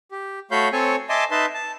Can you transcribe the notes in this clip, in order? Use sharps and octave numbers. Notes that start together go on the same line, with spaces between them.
G4
A3 F#4 C#5 F5 B5 G6
C4 A4 C#5 G#5 C#6
D#5 E5 G#5 A5 C6 D6
D#4 B4 E5 A5 C6
A5